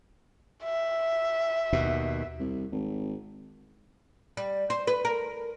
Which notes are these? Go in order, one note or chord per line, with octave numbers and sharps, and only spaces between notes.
E5
D#2 B2
C2
G#1
G3
C5
B4
A#4